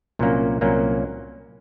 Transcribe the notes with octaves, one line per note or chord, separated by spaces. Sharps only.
C2 A#2 F#3 A#3 C#4
C2 A#2 F#3 A#3 C#4